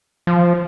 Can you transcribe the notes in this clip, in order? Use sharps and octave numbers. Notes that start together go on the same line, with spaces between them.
F3